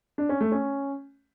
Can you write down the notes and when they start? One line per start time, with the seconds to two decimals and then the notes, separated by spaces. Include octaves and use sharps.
0.18 D4
0.29 C#4
0.41 A3
0.52 C#4